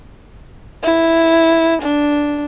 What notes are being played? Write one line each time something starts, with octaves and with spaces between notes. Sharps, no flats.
E4
D4